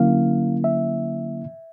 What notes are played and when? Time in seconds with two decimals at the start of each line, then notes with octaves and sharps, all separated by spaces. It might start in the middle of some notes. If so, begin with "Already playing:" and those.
Already playing: D3 F#3 A#3 C#4 E4 F5
0.64 E5